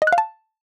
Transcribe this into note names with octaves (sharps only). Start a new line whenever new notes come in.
D#5
F#6
F5
A5